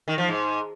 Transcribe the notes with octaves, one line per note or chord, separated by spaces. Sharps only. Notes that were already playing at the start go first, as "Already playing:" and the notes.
D#3
F3
G#2